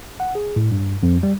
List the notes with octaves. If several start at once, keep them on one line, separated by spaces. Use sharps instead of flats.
F#5
G#4
A2
G2
F2
G3